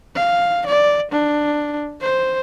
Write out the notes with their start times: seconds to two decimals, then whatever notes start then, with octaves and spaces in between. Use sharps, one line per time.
0.15 F5
0.66 D5
1.11 D4
2.01 C5